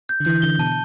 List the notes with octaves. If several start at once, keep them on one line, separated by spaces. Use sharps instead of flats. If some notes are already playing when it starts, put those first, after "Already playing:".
G6
D3
E3 G6
D3 G7
B2 A5